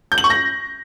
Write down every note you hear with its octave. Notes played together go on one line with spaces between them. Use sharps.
G6
F#7
C#6
A#6